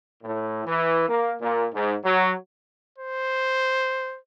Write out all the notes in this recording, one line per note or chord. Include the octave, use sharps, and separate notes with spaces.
A2
E3
A#3
A#2
G#2
F#3
C5